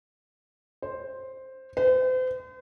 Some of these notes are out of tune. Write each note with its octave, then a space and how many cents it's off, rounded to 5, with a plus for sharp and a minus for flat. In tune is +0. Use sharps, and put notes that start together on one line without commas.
C5 +5
C5 -40